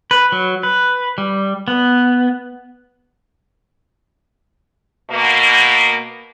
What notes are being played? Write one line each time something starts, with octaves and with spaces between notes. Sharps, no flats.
B4
F#3
B4
G3
B3
B2 A#3